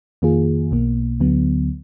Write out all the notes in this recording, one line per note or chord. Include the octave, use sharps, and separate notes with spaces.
F2 D#3 A#3 F4 G#4
B1 B2 A#3
D2 D3 F#3 B3